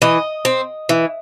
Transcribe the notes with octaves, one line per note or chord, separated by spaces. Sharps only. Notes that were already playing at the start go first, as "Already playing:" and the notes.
E3 D#5
C4
E3